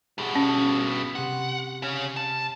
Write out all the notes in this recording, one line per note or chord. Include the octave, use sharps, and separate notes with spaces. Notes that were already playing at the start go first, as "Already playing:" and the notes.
G2 B2 G4 G#4 F#5
C#4
C3 G4 F#5 C6
C#3 C#4
A5